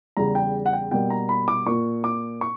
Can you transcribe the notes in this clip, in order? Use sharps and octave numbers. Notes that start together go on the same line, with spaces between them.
E2 C#3 G3 A#5
G5
F#5
G5
B2 G3 A#3 G5
A#5
B5
D6
A#2 A#3 C#6
D6
C#6